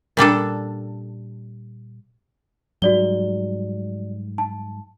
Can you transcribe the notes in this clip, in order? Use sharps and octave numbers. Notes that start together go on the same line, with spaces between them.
A#2 G3 D4 A4
G#2 F#3 G3 F#4 D5 G7
A5